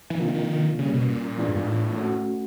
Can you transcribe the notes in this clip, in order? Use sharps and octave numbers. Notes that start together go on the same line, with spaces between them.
E3
C3 D#3 F3 A#3 D4 F4
D#3
C#3 G3 A#3 C#4
B2
A#2
E3 G#3 B3 D4 F4
G2
G#2
A2
A3 C#4 F#4